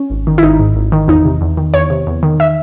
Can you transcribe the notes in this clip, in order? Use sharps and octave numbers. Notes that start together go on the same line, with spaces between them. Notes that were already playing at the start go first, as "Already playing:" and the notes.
Already playing: C#4
G#1
D#3
E4
G#1 D#4
G#2
G#1
D#3
E2 D#4
C3
E2
D#3
E2 C#5
C3
E2
D#3
E5